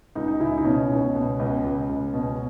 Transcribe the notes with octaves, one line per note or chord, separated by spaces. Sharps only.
C#2 D#4
D#4
C#3 E4
D#4
B2 C#4
C#2
B2
C#2
C#2
C#2
B2